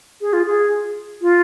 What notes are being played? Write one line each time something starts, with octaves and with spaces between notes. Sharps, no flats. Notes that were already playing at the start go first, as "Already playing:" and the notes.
G#4
F4
G#4
F4